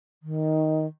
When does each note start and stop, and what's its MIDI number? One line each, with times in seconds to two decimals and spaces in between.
0.23 0.86 51